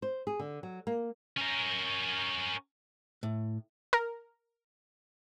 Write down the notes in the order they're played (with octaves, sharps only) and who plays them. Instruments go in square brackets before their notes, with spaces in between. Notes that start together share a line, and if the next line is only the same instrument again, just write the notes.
[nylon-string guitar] C5
G#4
D3
F#3
A#3
[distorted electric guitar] C#4 A#4
[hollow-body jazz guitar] A2
[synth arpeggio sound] A#4